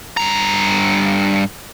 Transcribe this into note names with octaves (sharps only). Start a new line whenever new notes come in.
G2 A#5